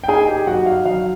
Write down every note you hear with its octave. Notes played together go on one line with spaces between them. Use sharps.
G5
D#4 G#4 G#5
G4 G5
F#3 F#4 F#5
F5
F#3 F5